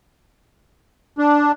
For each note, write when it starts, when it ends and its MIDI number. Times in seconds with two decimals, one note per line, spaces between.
1.18 1.52 62